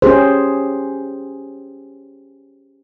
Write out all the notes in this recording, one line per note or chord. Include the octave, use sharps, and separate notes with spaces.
C#4 G4 G#4 C5